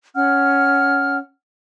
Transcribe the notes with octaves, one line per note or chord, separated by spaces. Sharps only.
C#4 F#5 F6